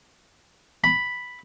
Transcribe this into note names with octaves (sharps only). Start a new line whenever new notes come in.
B5